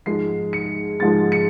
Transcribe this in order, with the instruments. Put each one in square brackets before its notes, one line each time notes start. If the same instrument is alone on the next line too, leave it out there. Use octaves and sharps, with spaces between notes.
[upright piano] G#2 F3 G#3 C7
C#7
G#2 F3 G#3 A6
C#7